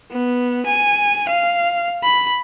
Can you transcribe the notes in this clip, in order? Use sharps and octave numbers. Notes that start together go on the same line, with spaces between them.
B3
G#5
F5
B5